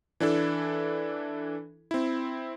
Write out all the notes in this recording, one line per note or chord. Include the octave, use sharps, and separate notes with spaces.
E3 D4 E4 A4
C4 E4